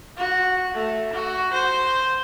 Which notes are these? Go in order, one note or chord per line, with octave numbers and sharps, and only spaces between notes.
F#4
A3
F#4
C5